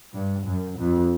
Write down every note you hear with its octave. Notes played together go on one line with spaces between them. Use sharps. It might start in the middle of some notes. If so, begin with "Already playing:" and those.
G2
F#2
F2